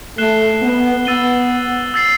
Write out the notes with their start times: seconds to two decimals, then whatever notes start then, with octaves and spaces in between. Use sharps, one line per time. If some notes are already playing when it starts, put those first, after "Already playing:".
0.18 A3 F#6 C7 E7 G7
0.62 B3
1.05 B3 E6 A6 D#7 G7
1.94 E6 A6 C7